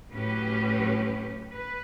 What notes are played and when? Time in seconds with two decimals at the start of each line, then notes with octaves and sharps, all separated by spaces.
0.10 A2 F#3 C#4 G4 B4
1.53 B4